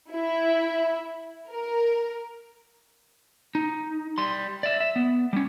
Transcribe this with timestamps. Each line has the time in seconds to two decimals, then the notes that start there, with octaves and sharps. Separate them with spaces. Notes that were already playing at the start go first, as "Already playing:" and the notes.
0.11 E4
1.49 A#4
3.55 D#4
4.18 G3 C6
4.63 D5 E5
4.80 E5
4.96 B3
5.33 G3 C#4